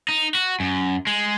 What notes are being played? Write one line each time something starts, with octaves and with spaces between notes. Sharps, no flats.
D#4
F#4
F#2
G#3